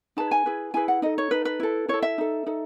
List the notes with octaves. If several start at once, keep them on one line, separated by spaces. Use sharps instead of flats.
D#4 G#4 B4 A5
G#5
E4 G#4 B4
E4 G#4 B4 G#5
F#5
D#4 A4 D#5
C#5
D#4 A4 B4
B4
E4 A4
E4 A4 C#5
E5
D#4 A4
D#4 A4